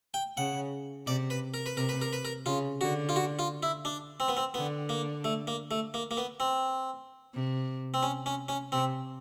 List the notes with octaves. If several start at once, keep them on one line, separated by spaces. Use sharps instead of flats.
G5
C#3 F#5
C3 D5
B4
A#4
B4
C3 A#4
B4
A#4
B4
A#4
C#3 F4
D3 F#4
F4
F#4
F4
E4
D4
C4
B3
C4
D3 B3
A#3
A3
A#3
A3
A#3
A#3
B3
C4
C3
C4
C#4
C#4
C#4
C3 C4